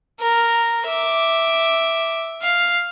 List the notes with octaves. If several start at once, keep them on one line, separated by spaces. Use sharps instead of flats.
A#4
E5 D6
F5